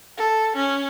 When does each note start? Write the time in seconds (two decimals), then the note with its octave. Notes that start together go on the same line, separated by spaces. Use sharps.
0.18 A4
0.56 C#4